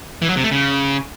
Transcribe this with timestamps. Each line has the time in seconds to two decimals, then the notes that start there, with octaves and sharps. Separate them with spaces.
0.22 E3
0.29 F#3
0.37 C3
0.44 A3
0.51 C#3